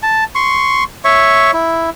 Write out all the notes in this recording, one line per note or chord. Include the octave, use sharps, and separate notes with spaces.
A5
C6 C#6
C#5 E5 C#6
E4